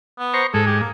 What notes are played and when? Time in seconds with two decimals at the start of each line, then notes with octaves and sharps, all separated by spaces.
0.19 B3
0.34 C5 A#5 C#6
0.54 G#2 G#3 A4
0.67 G4
0.80 A#3